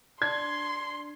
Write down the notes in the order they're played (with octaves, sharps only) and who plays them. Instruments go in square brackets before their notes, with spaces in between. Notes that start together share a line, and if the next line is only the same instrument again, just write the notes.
[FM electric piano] D4 [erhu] C6 [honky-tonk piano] G#6